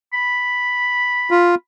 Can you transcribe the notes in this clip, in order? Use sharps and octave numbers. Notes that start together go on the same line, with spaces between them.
B5
F4